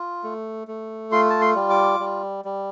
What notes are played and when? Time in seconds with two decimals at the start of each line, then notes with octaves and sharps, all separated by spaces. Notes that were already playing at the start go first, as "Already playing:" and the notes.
Already playing: F4
0.24 A3
0.68 A3
1.12 F4 C6
1.30 A5
1.41 C6
1.55 G3
1.70 D6
1.99 G3
2.45 G3